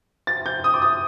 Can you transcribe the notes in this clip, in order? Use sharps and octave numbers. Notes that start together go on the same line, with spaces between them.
A6
G6
D#6
D6
D#6